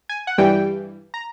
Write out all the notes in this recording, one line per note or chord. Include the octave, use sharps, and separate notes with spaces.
G#5
F#5
G2 E3 G3 G5
A#5